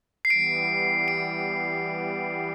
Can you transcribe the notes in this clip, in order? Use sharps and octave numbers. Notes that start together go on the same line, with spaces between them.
C7
E3 G3 B3 D7
D7